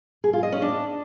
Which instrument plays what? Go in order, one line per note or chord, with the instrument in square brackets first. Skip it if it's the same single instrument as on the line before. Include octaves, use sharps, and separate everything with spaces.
[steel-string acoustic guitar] G#4
F4
D#5
C#4
D4